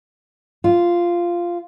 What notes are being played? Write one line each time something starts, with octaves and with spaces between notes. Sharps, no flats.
F4